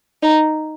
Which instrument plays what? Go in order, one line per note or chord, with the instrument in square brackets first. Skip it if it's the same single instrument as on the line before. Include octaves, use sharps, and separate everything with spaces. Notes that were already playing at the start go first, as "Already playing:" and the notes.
[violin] D#4